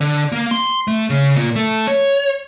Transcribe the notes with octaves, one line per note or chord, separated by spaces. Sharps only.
D3
A#3
C6
A3
C#3
A#2
A3
C#5